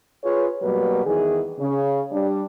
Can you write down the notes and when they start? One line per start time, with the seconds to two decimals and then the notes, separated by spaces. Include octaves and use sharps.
0.24 F4 G#4 B4 C#5
0.62 B2 F#3 G3 A#3 B4
1.06 E2 D#3 E3 G#4
1.60 C#3
2.12 G3 D4